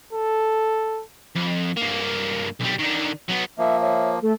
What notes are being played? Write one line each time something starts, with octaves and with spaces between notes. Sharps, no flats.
A4
F2
G2 A#3
B1 G3
D3 D#3
F#3 B3
F3 A#3 E5
C#5 E5
A3 A4